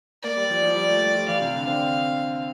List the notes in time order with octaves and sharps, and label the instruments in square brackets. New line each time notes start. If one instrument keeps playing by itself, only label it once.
[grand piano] A#3 [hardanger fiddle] D5
[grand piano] G3
F3
F3
G3
A3
G3
F3
[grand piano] E3 [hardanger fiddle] F5
[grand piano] C3
D3
D4
C4